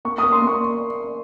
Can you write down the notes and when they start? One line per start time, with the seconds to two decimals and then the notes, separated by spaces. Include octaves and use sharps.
0.05 A#3 C#6
0.18 A#3 D#6
0.33 C6
0.42 A#3
0.47 C#6